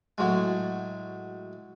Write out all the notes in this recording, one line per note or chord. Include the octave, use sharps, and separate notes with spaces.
A2 F#3 G#3